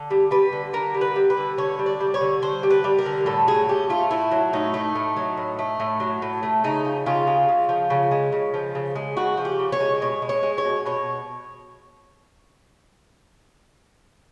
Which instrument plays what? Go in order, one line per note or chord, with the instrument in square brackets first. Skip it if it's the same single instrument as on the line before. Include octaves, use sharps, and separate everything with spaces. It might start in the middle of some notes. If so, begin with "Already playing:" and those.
Already playing: [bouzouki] D3
G3
G3 B4
D3
D3 A#4
G3
B4
G3
B4
D3
D3 C#5
G3
D5
G3
C#5
D3
D3 C5
G3
B4
G3
A#4
D3
A2 A4
F#3 G#4
A2 G4
A3 F4
A2 E4
F#3
A2 D#4
A3
A2
F#3
A2
A3
A2
F#3
A2
A3
C#3 D#4
F3
C#3 F4
G#3
C#3
F3
C#3
G#3
C#3
F3
C#3
G#3
C#3 F#4
F3
G4
C#3
C#5
G#3
B2 C#5
G#3
C#5
G#3
C#5
B2
B2 C#5